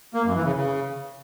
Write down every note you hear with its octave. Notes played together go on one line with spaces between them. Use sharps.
A#3
F#2
E3
C#3
C#3